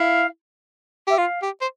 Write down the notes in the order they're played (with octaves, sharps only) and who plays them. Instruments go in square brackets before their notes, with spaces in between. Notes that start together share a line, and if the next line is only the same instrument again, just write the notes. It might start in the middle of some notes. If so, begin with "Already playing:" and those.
Already playing: [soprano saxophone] E4 [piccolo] F5
[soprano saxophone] G4 [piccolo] E5
[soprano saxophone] F4 [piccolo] F5
[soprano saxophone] G4
C5